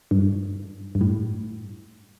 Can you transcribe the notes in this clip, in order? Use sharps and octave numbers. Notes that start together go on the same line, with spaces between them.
G2
G2
A2